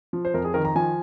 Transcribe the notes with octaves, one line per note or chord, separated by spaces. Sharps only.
F3
C5
F2 A#4
G#4
D#3 A#4
A#5
F3 G#5